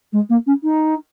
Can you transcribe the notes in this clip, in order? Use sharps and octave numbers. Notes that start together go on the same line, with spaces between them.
G#3
A#3
C#4
D#4